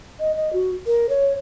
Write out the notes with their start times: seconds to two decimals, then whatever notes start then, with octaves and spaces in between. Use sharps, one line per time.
0.20 D#5
0.36 D#5
0.53 F#4
0.87 A#4
1.09 C#5